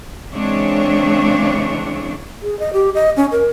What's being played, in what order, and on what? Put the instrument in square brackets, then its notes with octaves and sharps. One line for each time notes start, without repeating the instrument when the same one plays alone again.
[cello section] C#3 E3 G#3 C4 D4 C#5
[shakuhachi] G#4
D#5
G4
D#5
C#4
A#4